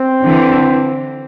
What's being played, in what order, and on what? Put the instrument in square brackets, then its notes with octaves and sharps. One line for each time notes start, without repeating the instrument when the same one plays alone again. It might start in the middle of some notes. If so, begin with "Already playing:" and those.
Already playing: [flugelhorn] C4
[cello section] D3 E3